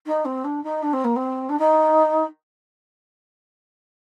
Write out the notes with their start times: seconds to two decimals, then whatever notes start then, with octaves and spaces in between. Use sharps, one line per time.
0.06 D#4
0.25 C4
0.44 D4
0.63 D#4
0.82 D4
0.93 C4
1.04 A#3
1.16 C4
1.49 D4
1.59 D#4